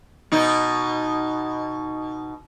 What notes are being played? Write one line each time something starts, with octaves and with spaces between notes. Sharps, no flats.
B2 D#4